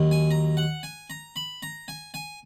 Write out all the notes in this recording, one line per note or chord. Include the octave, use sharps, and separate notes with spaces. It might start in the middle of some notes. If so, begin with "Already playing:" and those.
Already playing: D#2 D#3 F#3
G#5
A#5
F#5
G#5
A#5
B5
A#5
G#5
G#5